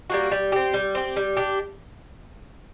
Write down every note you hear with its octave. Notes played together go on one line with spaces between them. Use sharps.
G3 A#3 F#4
G3
C4 G4
G3
C4 G4
G3
D4 G4